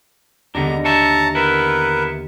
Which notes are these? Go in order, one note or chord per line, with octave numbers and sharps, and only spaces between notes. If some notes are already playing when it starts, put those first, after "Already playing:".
D#2 D3 B3 D4 A#5
C#5 E5 A5 A#5
B3 E4 A#4 B4